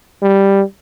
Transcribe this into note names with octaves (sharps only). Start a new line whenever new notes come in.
G3